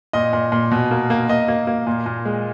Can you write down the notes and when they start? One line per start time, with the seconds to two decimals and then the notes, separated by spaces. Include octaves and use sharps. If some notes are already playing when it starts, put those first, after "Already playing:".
0.13 A#2 D#5
0.33 A#2
0.52 A#2
0.71 B2
0.91 A#3
1.10 A#3
1.29 A#3 D#5
1.48 A#3
1.67 A#3
1.87 A#2
2.06 A#2
2.25 G#3